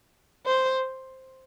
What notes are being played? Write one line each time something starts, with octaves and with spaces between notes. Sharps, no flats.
C5